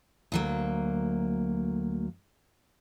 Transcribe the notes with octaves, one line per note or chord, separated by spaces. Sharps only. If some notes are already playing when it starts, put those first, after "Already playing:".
D2 F#3 A#3